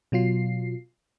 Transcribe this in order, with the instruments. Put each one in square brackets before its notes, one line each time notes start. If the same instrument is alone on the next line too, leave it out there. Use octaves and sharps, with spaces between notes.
[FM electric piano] B2 F#3 F4 C7